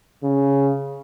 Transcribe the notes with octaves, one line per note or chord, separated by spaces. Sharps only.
C#3